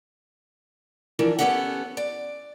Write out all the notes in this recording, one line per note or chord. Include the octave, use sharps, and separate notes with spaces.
E3 F3 D4 A#4
B3 C#4 G4 A4 E5 F#5
D5